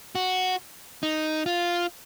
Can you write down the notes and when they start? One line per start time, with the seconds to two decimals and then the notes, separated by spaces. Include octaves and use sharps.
0.15 F#4
1.03 D#4
1.46 F4